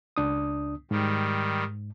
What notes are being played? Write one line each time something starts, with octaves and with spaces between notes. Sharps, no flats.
C#2 D4 D#6
G#2 D#3 G3